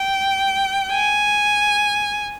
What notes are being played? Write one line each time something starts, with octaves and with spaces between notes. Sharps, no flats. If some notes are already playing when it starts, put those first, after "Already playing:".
Already playing: G5
G#5